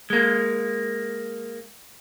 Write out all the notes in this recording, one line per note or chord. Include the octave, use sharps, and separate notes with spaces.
G#3 A#3